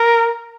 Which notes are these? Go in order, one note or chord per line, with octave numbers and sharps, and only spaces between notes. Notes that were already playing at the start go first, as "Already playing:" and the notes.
Already playing: A#4